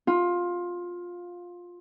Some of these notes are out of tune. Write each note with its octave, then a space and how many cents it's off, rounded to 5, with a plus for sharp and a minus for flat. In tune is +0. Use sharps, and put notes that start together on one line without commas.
F4 +15